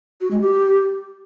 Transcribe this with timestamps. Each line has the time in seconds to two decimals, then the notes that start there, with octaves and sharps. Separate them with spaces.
0.21 F#4
0.31 G#3
0.41 G4